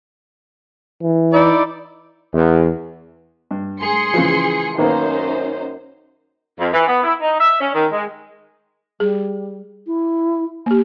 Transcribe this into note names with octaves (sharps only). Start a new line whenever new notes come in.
E3
D#4 E4 D5
E2
G2
G#4 C6 C#7
C#3 E3 F3
F#2 D#3 A#3 B3 D#4 C5
F2
E3
B3
E4
D#4
E5
C#4
D#3
G#3
G3 G#4
E4
A#3 G4